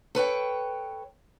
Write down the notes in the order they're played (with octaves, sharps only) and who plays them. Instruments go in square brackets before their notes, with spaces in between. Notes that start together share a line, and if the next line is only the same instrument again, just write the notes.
[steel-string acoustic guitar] A4 B4 C#5 G5